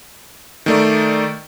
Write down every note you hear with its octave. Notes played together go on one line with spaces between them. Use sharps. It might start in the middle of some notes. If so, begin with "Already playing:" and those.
D#3 A3 D5